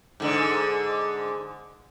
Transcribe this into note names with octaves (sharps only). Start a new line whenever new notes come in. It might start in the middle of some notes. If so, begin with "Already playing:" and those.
G#2 D3